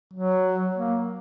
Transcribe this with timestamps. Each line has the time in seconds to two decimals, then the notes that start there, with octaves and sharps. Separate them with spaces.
0.13 F#3
0.75 A#3